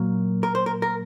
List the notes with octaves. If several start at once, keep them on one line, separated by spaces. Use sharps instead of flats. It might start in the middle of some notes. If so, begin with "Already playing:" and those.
Already playing: A#2 F#3 A#3
A#4
C5
A#4
A#4